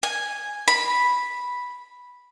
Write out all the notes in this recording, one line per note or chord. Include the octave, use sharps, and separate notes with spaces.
G#5
B5